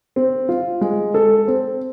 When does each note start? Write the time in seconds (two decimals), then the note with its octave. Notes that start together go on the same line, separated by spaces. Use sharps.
0.16 C4
0.49 F4
0.81 G#3
1.14 A4
1.48 C4